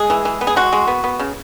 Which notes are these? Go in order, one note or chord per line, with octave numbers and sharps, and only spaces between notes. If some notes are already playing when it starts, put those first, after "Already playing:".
Already playing: G#3 G#4
E3
E3
B3
G#4
G#3 F#4
G#3
B3
B3
C#3